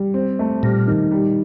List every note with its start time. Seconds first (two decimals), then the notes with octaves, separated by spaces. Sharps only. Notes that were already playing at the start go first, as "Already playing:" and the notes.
Already playing: G3
0.14 C4
0.39 A3
0.63 A#2 G3
0.87 D#3
1.11 G3